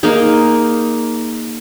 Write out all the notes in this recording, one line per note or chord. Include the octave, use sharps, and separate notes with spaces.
A#3 D#4 G#4